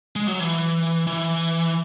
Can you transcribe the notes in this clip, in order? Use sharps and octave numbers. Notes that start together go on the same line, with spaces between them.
G#3
F#3
E3
E3